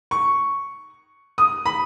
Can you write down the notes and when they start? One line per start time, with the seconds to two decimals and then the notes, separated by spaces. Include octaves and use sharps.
0.11 C#6
1.38 D#6
1.66 B5